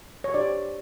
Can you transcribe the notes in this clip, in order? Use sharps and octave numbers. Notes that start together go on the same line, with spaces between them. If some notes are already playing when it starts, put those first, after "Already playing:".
C#5
D4 G4 C5 D5